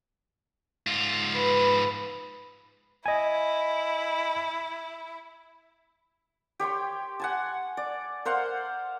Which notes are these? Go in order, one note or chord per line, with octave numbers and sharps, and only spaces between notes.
G#2 F4
B4
E4 D#5 G#5
G4 C#5 G5 C6
F#5 G#5 A5
D5
A#4 C5 F5 F#5